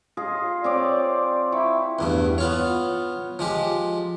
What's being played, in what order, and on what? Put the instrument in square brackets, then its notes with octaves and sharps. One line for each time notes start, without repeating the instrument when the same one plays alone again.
[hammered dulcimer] F4 G#4 D#5
[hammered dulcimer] C4 C#5 D6 [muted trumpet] D5
[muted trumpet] E4 [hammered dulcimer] G5 C#6 D6
[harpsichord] E2 G2 A3
B3 F4 C#5
F3 G#3 G4